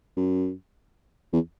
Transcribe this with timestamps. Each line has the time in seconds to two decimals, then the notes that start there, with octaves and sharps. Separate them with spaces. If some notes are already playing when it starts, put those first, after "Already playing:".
0.17 F#2
1.33 E2